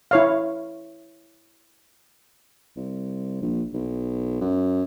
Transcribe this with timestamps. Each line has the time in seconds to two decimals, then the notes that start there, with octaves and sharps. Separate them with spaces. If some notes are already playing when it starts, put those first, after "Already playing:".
0.11 E4 C#5 F5
2.77 C2
3.41 A#1
3.74 B1
4.41 F#2